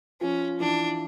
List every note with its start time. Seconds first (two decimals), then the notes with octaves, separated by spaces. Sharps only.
0.21 F3 C#4
0.60 E3 D4